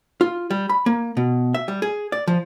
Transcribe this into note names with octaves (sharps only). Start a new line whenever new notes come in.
F4
G3
B5
A#3
B2
E5
G3
G#4
D5
F3